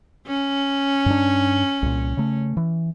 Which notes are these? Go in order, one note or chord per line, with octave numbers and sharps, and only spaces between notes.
C#4
G2 D4
C2 A#2
C#3 A3
E3